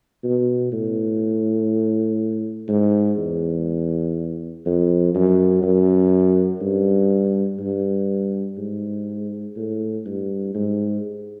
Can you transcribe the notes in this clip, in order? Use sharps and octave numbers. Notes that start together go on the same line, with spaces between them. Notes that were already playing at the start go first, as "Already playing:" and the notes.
B2
A2
G#2
E2
F2
F#2
F#2
G2
G2
G#2
A2
G2
G#2